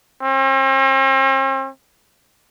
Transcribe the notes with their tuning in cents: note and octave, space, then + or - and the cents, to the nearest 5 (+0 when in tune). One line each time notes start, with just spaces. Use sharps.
C4 +45